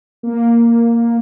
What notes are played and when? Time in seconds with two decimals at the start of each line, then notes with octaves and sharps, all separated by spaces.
0.23 A#3